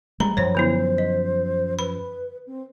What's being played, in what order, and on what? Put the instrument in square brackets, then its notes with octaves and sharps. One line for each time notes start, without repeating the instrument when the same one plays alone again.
[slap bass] G3 G#3 [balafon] A#5 B5
[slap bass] F#2 F3 [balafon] C5 C#5
[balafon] D3 B3 E4 [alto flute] C5
[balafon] D#5
[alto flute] B4 [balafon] B5
[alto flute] C4